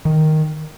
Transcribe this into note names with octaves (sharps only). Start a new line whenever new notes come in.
D#3